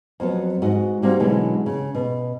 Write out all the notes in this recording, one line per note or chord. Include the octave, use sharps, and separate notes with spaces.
F2 F#3 B3
G#2 F#4 D#5
G3 A#3 C4 D#4 F#4
B2 D3 E3 F#3 G#3 C#4
C#3
B2